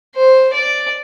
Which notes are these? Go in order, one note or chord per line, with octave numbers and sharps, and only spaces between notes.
C5
D5